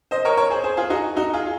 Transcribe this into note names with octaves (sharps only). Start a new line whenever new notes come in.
C5 D#5
A#4 C#5
A#4 C#5
G#4 C5
G#4 C5
F4 G#4
D#4 F#4
D#4 F#4
F4 G#4